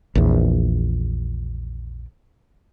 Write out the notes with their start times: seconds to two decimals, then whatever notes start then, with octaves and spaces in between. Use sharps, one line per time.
0.15 A#1 E2